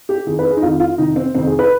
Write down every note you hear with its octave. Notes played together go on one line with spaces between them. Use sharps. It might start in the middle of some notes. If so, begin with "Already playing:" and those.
G4
F2 D#3 G#4
B4
G#4
D#4
F2 D#3 F4
F4
F2 C3 D#3 D#4
C4
F2 C3 D#3 C4
G#4
B4